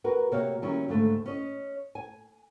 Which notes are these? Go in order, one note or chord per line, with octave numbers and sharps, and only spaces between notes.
F#4 A#4 B4
C3 A#3 F#4 C#5 F5
D#3 F#3 G3 C#4 E4
D#2 G#2 D3 A3
C#4 D#5
G#5